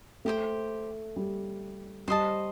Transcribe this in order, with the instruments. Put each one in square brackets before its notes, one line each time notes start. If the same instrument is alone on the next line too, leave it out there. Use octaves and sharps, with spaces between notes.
[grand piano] A3 [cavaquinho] G4 C5 G5
[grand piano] G3
[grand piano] G3 [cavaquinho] C5 D#5 A5